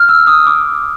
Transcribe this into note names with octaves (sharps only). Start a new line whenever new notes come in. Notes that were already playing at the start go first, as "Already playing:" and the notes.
Already playing: F6 F#6
E6
D#6
D6